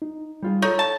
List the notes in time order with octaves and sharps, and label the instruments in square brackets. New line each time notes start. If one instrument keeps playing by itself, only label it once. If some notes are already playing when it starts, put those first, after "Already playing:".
[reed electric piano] D#4
[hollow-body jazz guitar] G3 F4 G#4
[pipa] D#4 [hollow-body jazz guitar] A4 C#5 [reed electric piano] C#6
[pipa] A5